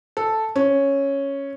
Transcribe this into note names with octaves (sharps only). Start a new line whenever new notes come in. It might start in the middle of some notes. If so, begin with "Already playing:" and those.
A4
C#4